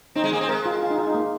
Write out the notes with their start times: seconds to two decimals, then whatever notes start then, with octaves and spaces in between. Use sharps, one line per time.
0.15 C4 D#4
0.24 G#3
0.32 A#3 G#4
0.41 C4
0.48 G#3 A#4
0.66 F4
0.82 F4
0.90 D#4
0.98 F4
1.07 D#4
1.14 A#3